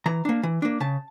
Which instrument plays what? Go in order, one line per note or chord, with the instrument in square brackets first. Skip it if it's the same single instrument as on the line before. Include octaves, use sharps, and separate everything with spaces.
[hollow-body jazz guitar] E3 A#5
A#3 D4
E3
A#3 D4
C#3 A5